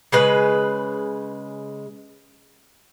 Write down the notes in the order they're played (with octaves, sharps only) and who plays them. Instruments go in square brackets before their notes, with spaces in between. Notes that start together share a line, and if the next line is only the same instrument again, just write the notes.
[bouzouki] C#3 G#3 B4